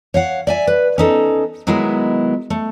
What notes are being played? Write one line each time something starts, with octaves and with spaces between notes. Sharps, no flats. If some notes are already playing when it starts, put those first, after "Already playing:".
C#5 F5 F#5
D5 E5 G#5
B4
C#4 D#4 A4
D#3 F#3 G#3 B3 E4 G#4
A3